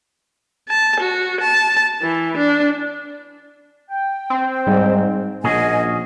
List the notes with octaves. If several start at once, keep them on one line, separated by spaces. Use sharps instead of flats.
A5
F#4
A5
E3
D4
G5
C4
G#2 G3
A#1 A#2 C#4 F#4 G#4 D#5 G#5